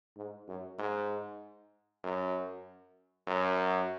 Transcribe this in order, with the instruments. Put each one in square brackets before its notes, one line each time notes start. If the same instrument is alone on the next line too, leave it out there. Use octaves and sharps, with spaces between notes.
[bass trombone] G#2
F#2
G#2
F#2
F#2